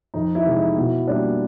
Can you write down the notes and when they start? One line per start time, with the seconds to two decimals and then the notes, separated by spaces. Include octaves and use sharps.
0.14 F2 D#4
0.35 E4
0.45 C3 E3 G#3
0.56 D#4
0.76 B2 E4
1.08 G3 A#3 D4